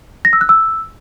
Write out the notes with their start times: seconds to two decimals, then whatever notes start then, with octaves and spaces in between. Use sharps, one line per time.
0.25 A#6
0.33 E6
0.41 F#6
0.49 E6